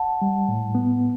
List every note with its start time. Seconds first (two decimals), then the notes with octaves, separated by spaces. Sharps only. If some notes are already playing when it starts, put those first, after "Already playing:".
Already playing: F#5 A5
0.22 G3
0.49 A2
0.75 B3